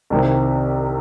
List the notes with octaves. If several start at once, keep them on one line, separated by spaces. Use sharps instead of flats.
C2 C3 D#3